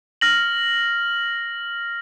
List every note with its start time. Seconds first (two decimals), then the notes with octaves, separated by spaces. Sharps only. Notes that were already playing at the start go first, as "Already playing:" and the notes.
0.21 F6 A#6 F#7